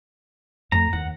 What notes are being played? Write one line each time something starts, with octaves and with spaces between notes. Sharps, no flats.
F2 A3 A#5
D#2 F#5